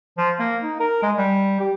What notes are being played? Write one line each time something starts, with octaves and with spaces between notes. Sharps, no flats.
F3
A#3
D#4
A#4
G#3
G3
G4